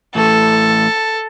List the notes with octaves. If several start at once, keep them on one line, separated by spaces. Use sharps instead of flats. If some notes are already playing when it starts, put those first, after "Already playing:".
A2 E3 A3 A4